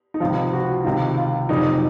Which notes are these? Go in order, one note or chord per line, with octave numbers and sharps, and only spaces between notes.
D#4
C#2 C3 F3 F4
F#4
C#2 C3 D#3 F4
F4
F#1 F2 C3 D#4